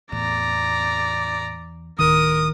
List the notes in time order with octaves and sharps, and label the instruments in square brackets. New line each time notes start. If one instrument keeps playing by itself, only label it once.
[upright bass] E2 [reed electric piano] A2 [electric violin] D5 A#5
[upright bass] D1 [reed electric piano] D#3 [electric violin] A#4 [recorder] D#6